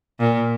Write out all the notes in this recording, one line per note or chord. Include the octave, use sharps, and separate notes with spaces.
A#2